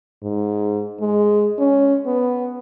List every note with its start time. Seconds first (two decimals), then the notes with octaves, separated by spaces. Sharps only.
0.23 G#2
1.01 G#3
1.59 C#4
2.06 B3